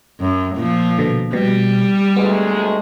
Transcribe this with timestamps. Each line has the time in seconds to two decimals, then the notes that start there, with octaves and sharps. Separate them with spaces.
0.20 F#2
0.56 A#2 F3
0.98 B2 D3
1.33 B2 G3
2.16 D2 G#3 B3